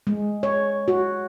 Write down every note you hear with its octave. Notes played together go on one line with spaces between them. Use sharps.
G#3
C#5
F#4